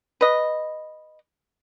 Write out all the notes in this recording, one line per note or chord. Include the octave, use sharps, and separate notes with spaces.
B4 D#5